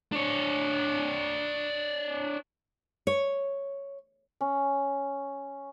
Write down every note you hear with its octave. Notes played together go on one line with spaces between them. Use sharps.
D4 C#5
C#5
C#4